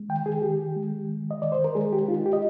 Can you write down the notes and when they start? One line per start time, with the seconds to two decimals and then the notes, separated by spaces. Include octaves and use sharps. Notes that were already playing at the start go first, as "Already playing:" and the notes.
Already playing: G#3
0.09 D#3 G5
0.26 G#4
0.42 D#3 G4
0.76 G#3
1.08 D#3
1.31 D#5
1.42 D#3 D5
1.52 C5
1.64 A#4
1.75 G#3 G#4
1.93 G4
2.08 D#4 F4
2.26 G4
2.33 D#5